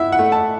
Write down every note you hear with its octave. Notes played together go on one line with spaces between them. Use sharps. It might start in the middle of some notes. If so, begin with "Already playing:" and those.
Already playing: E4 E5 F#5
F#5
A3
A5